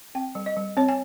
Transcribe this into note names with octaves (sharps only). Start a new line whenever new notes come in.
C4 G5
G3
D#5
G3
C4 C#5
G#5